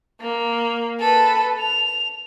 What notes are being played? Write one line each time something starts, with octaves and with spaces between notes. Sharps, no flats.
A#3
A4 B4
F7